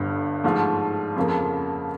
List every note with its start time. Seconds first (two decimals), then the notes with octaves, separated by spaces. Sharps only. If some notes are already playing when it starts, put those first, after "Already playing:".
Already playing: G1 G2 D3
0.44 G#2 F3 A3
1.16 F2 C#3 F3 A#3